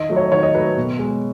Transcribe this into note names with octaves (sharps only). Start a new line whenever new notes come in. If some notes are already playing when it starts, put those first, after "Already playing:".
Already playing: D#3 D#5
F#3 A3
C#5
D#3 C#5
D#5
F#3 A3 B4
B2
G#3